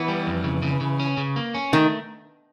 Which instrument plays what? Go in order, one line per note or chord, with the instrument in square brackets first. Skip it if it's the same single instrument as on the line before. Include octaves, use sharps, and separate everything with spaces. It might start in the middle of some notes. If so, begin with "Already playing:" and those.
Already playing: [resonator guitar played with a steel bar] E3 [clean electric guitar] B3
[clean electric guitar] G3
F2
C#3
C#3
C#3
C#4
C#3
A#3
C#4
[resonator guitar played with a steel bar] D#3 [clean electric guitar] A3